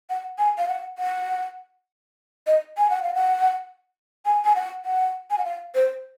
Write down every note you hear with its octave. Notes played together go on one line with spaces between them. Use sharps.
F#5
G#5
F5
F#5
F#5
D#5
G#5
F#5
F5
F#5
G#5
G#5
F#5
F#5
G#5
F#5
F5
C5